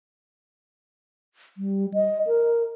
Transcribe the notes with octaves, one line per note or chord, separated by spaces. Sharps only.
G3
D#5
A#4